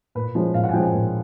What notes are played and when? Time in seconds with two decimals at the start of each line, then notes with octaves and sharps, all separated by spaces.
0.15 A#2 B4
0.35 F3 G#3 C#4
0.54 A#2 F5
0.64 F#5
0.69 G#5
0.73 F3 G#3 C#4 G5
0.83 G#5
0.93 A#2